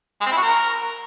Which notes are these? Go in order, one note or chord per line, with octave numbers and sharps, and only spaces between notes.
G#3
C4
E4
F#4
A#4